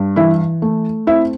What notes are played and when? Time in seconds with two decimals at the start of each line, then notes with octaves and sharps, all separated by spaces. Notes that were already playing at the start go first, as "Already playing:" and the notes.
Already playing: G2
0.16 E3 E4 E5
0.62 A3
1.07 C4 E4 E5